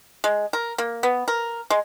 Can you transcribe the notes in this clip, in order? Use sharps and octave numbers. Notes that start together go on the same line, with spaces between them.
G#3
A#4
A#3
B3
A#4
G#3